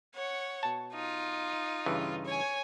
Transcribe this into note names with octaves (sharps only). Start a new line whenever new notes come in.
C#5 F#5
B2 A5
D#4 F4
G2 C#3 E3
C#5 G#5